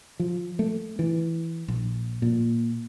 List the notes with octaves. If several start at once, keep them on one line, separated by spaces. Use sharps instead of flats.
F3
A3
E3
A#1
A#2